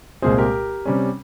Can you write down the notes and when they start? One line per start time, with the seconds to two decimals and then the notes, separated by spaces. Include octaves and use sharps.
0.22 C2 A#2 G#3 C4 G#4 C5
0.38 G4 A#4
0.86 C3 G3 C#4